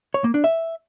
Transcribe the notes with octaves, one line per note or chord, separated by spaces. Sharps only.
C#5
A#3
D4
E5